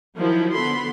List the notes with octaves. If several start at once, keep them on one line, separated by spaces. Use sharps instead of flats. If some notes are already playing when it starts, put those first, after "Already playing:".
D#3 F3 F#3 E4
D3 B3 A4 B5 C6